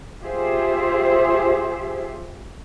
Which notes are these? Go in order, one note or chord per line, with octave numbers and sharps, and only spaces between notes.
F4 G4 G#4 C5 E5